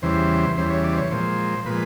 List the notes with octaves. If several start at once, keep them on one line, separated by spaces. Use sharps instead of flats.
E2 C#3 E3 G3 C5
E2 C#3 E3 G3 C5
C#5
D5
C5
C#5
A#2 F3 G#3 C5
A#2 F3 G#3 B4